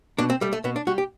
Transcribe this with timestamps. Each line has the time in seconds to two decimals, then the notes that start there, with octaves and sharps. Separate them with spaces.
0.18 B2 D4
0.30 C4
0.41 G3 A3
0.53 A3
0.64 B2 B3
0.76 D4
0.87 G3 F#4
0.98 G4